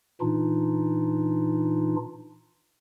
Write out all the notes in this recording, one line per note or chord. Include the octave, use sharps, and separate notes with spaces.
A#2 E3 D4 D#4 F4